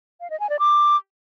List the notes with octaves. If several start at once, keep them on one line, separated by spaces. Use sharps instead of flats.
F5
D#5
G#5
D5
D6